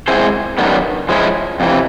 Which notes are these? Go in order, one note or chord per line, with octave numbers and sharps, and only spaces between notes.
G#3 C4 E4 G#4 C5
F#2 D#3 G3 B3 D4
F3 G#3 C#4 E4
F2 C3 E3